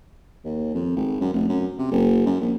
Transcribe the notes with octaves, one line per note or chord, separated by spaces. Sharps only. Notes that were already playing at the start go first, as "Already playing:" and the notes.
D#2
F2
G#1
F#2
F1
F#2
C3
F#1
F#2
A#1